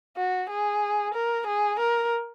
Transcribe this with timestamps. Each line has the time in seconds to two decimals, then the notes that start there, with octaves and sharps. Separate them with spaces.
0.17 F#4
0.49 G#4
1.14 A#4
1.47 G#4
1.79 A#4